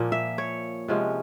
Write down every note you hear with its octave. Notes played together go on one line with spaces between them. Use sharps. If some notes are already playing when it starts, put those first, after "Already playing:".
Already playing: A#2 F3 A#3
E5
C#5
C3 F3 G#3 C#4